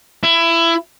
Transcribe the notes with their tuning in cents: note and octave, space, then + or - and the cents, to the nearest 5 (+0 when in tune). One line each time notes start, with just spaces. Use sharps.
E4 +20